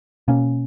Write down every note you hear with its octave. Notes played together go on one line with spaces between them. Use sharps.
B2 A#3 C#4